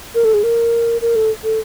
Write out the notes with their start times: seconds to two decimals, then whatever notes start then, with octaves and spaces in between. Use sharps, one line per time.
0.15 A#4
0.25 A4
0.34 G#4
0.43 A#4
1.02 A#4
1.16 A4
1.44 A4